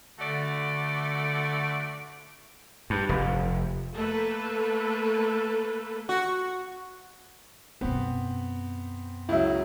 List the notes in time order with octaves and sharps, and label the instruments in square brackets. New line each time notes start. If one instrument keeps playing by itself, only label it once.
[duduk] D3 [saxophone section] A3 F#4 D5
[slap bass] G2
F1
[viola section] A3 A#3 A4 B4
[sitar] F#4
[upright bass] F#2 B2 [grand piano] B3 C4
[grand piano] C#2 F#3 [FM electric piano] E4 E5